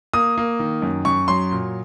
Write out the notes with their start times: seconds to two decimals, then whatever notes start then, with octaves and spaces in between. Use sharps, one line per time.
0.13 A#3 D#6
0.38 A#3
0.59 D#3
0.82 F#2
1.05 F#2 C#6
1.28 F#3 C6
1.51 A#2